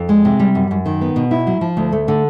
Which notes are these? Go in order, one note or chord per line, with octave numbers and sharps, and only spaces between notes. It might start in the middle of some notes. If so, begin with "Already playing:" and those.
Already playing: F2
G#3
C3
G3
F#2
F#2
D#3
B3
B2
E4
F#3
F3
D2
A3
D3